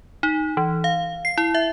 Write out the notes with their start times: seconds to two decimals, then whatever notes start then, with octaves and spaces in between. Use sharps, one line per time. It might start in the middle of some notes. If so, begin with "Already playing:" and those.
0.23 D#4
0.57 E3
0.84 F5
1.25 C7
1.38 E4
1.55 E5